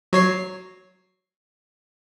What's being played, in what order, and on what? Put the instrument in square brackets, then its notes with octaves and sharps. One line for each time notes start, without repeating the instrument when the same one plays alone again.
[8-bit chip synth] F#3 C#5 C7